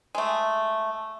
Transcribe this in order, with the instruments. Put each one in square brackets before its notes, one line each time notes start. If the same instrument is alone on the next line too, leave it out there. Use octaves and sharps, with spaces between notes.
[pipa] G#3 A3